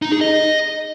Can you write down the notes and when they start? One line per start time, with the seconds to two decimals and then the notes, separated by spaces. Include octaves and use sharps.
0.02 D#4
0.12 G#4
0.21 D#5